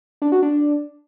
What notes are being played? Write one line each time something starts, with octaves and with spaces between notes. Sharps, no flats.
D4
F#4
D4